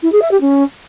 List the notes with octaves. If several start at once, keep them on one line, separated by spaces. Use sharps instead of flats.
E4
G#4
E5
G4
C#4